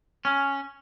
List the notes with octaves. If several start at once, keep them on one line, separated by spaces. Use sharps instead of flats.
C#4